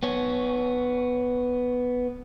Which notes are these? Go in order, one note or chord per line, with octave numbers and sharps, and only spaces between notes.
B3 C#5